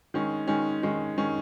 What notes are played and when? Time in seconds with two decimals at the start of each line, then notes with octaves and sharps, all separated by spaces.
0.14 D#3 G#3 C#4
0.48 D#3 G#3 C#4
0.83 D#3 G#3 C#4
1.18 D#3 G#3 C#4